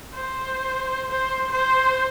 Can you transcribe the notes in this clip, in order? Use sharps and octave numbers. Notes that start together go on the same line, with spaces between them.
C5
C5
C5